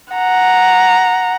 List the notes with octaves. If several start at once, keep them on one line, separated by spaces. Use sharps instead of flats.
F#5 A#5